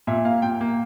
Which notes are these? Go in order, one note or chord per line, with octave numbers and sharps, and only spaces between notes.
A#2 E5
A#3 F5
A#2 G5
A#3